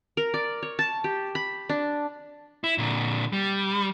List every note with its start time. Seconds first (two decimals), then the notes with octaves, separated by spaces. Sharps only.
0.17 A#4
0.34 D5
0.62 C#5
0.79 A5
1.04 G4
1.35 B5
1.69 D4
2.64 E4
2.78 A#2 D3
3.33 G3